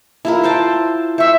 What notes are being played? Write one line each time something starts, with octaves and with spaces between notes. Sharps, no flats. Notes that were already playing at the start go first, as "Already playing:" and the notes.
E4 F4 A#4
C5 G5 A5
C5 E5 C#6